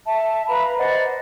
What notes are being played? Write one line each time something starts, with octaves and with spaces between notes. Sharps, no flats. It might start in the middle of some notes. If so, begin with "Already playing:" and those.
E5 A5
B4 F5 A#5 B5
C5 D5 D#5 F#5